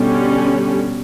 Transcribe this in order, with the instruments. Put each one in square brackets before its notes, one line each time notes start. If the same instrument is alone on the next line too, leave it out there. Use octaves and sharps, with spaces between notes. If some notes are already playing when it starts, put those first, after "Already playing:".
Already playing: [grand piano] B2 [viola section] D3 G3 C#4